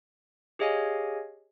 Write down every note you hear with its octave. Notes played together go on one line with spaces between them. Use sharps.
G4 G#4 C#5 D#5 F5 G#5